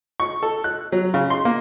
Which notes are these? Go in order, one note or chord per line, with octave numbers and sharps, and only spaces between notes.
C#6
A4
F#6
F#3
C#3
C6
A#3